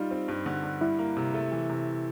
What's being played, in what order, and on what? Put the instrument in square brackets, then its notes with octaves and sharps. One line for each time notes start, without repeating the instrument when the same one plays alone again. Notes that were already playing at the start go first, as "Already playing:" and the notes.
Already playing: [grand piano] G3 F4 [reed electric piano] D#4
[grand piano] C4
G2
D3
G2
[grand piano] G3 [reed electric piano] E4
[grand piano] A#3
C3
A3
E3
C3